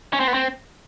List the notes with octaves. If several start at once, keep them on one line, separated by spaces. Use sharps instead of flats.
C#4
C4
B3
C4